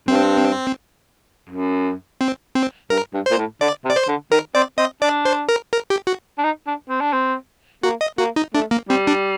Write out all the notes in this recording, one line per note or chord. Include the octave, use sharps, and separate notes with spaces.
G2 C4
F#2
C4
C4
G2 A#4
G2
A#2 C5
A2
D3 D5
C3
D5
C5
D3
D#3 A#4
C4 D5
C4 D#5
D4 D5
C5
A#4
A#4
G4
F#4
D4
D#4
D4
C4
D4
C4
A#3 F#4
D#5
A#3 F#4
D#4
A3 D4
A#3
G3 C4
D4